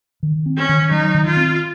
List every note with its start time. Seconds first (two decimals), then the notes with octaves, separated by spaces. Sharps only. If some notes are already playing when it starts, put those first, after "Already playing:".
0.23 D#3
0.46 C4
0.57 C#4
0.69 D#3
0.91 F#3 D#4
1.15 D#3
1.26 F4
1.37 C4